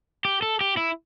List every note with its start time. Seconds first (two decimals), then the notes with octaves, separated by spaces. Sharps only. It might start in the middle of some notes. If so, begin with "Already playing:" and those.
0.25 G4
0.42 A4
0.61 G4
0.77 E4